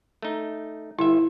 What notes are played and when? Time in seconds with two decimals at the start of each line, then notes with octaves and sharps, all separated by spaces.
0.22 A3 D#4
0.99 G1 E4 E5